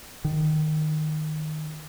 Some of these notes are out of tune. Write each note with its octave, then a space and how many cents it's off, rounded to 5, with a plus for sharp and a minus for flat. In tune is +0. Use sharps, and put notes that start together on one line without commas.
D#3 -10